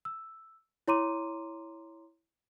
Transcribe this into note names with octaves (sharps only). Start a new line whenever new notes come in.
E6
E4 C#5 A#5 C6 D6 D#7